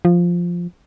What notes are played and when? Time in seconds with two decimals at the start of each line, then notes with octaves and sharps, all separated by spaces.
0.05 F3